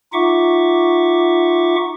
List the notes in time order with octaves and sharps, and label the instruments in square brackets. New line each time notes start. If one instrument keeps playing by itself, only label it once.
[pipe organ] D#4 F4 E5 F#5 C#6 D6